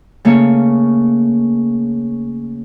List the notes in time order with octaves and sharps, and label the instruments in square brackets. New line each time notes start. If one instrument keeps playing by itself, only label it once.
[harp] C#3 A3 A#3 C#4 C#5